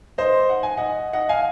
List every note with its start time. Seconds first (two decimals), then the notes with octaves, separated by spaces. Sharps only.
0.18 C5 D#5
0.50 F#5
0.63 G#5
0.77 D#5 F#5
1.13 D#5 F#5
1.29 F5 G#5